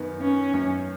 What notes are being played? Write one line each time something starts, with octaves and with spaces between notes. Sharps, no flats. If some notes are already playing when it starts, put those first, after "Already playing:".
Already playing: F#2 D#3 B3
B3 C#4
F#2